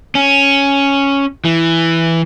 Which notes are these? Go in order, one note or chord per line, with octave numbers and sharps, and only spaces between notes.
C#4
E3